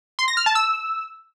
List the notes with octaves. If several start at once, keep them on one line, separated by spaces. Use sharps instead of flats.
C6
A#6
F6
A5
E6